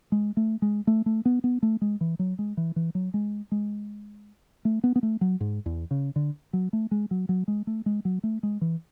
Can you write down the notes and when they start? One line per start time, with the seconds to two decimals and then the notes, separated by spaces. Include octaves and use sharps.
0.12 G#3
0.37 A3
0.62 G#3
0.87 A3
1.06 A3
1.25 B3
1.44 B3
1.63 A3
1.82 G#3
2.01 E3
2.19 F#3
2.39 G#3
2.57 E3
2.76 E3
2.95 F#3
3.14 G#3
3.52 G#3
4.65 A3
4.84 B3
4.96 B3
5.03 A3
5.21 F#3
5.41 G#2
5.66 E2
5.91 C#3
6.16 D3
6.53 F#3
6.73 A3
6.91 G#3
7.11 F#3
7.29 F#3
7.48 G#3
7.67 A3
7.86 G#3
8.05 F#3
8.23 A3
8.43 G#3
8.61 E3